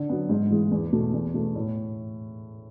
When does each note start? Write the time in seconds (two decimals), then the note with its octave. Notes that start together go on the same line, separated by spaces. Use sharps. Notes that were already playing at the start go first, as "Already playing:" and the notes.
Already playing: D3
0.09 F#3 B3
0.29 G#2
0.51 E3 G#3
0.71 E2
0.93 B2 A3
1.13 E2
1.34 B2 A3
1.55 A2